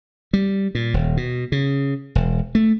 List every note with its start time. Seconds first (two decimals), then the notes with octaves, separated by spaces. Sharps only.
0.33 G3
0.75 A#2
0.94 D#1
1.17 B2
1.52 C#3
2.15 E1
2.55 A3